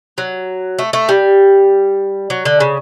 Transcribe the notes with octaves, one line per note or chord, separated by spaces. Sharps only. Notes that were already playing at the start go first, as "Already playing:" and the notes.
F#3
A3
A3
G3
F#3
D3
C#3